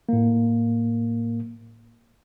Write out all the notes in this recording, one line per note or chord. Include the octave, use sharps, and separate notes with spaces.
A2 A#3